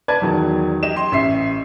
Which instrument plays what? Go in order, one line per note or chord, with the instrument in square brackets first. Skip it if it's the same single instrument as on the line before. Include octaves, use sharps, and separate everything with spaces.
[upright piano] B4 D5 A5 G#6
E2 D#3 F#3
G4 D#5 E7
C6
A1 E5 C7